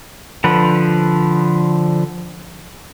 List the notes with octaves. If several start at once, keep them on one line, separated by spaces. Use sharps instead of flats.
D3 F3 B4